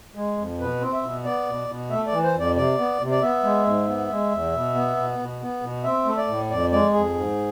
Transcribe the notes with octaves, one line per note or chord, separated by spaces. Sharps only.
G#3
F2
B2 B4
C4
E5
B2
B3 D5
B2
B2
A3 E5
D5
E3
C5
F2 D5
C3 D5
B3
C3
D5
B3 E5
G#3
G#2
B3
G#3
E2
B2
B3
B2
B2
B3
B2
C4 E5
A3 E5
D5
A2
F2 D5
G#3 D5
F2 G#4
G#2